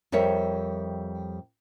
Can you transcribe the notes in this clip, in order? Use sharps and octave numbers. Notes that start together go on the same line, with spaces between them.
F2 G3 A#4 C#5 E5